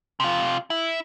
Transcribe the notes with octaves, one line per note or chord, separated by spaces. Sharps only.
C3 F4
E4